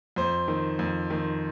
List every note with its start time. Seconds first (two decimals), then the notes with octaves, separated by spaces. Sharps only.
0.16 F2 C5
0.48 D#3
0.79 F2
1.10 D#3